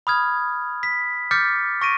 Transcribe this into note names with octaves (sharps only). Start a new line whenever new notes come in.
B5 D#6 F6 G#6
B6
D6 F6 G6 A6 B6 C#7
C#6 A#6 D7 D#7